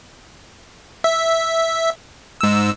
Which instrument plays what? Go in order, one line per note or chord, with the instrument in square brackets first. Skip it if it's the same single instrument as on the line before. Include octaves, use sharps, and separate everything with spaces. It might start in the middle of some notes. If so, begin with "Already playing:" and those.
[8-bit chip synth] E5
G#2 E6